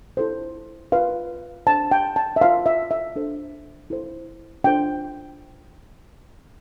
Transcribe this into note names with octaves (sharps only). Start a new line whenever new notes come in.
E4 A4 C5
F4 B4 F5
D4 A4 C5 A5
G5
A5
E5
F4 C5 F5
E5
E5
D4 A4 C5
E4 A4 C5
D4 F4 A4 C5 G5